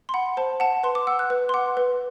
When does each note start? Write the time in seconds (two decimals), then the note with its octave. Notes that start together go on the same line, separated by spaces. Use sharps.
0.09 C6
0.14 F#5 B5
0.37 C5 A5
0.60 F#5 A5
0.83 B4 C6
0.95 D6
1.07 F#5 E6
1.19 F#6
1.30 B4
1.49 C6
1.54 F#5 D6
1.77 B4